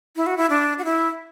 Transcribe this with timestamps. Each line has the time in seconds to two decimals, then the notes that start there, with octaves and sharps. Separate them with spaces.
0.16 E4
0.26 F#4
0.37 E4
0.50 D4
0.78 F#4
0.85 E4